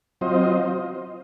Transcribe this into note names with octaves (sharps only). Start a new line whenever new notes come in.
F#3 C4 F4 C5 D#5